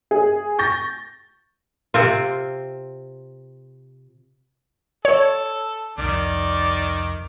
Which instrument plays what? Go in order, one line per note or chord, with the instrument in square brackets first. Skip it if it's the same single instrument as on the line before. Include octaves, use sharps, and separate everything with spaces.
[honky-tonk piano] G#4
C#6 G6 A6 A#6
[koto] C3 C4 F4
[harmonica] A4 [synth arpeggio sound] C#5
[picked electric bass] C2 F2 [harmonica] D#3 D6 [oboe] D5